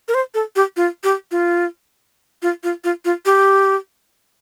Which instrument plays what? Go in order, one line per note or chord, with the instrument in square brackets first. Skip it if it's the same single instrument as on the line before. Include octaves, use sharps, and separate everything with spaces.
[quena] A#4
C5
A4
G4
F4
G4
F4
F4
F4
F4
F4
G4